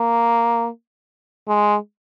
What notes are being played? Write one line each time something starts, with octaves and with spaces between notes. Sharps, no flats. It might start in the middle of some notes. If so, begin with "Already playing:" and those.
Already playing: A#3
G#3